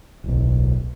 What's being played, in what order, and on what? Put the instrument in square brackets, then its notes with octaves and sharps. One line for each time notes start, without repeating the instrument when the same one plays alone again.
[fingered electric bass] D1 B1